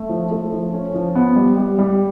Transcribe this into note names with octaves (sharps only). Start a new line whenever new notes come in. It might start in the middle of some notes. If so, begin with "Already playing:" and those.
Already playing: A3
F3
A3
F3
C#4
F3
B3
G3
G3
G3